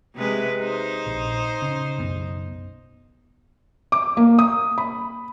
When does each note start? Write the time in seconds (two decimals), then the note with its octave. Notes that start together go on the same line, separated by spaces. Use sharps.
0.15 C3 G#3 B4
0.60 D#4 C5
1.07 A#1
1.62 C#3
1.98 B1 F#2 B3
3.92 D6
4.17 A#3
4.39 D#6
4.78 B5